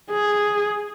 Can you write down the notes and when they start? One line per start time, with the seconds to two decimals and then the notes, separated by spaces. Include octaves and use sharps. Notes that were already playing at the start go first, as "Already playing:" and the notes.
0.11 G#4